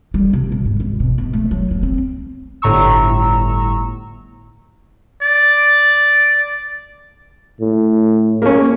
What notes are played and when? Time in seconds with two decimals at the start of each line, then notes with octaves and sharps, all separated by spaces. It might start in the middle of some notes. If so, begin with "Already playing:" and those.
0.14 G3
0.33 C3
0.52 B2
0.66 G#2
0.80 G#1
1.00 B2
1.18 B2
1.33 A3
1.51 F#3
1.71 A#3
1.83 C4
2.62 G1 A2 A#5 C#6 E6
5.23 D5
7.61 A2
8.42 A#3 C#4